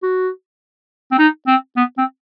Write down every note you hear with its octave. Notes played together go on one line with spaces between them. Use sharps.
F#4
C4
D#4
C4
B3
C4